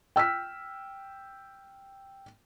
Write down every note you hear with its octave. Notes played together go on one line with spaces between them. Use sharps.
G5 E6 F6 B6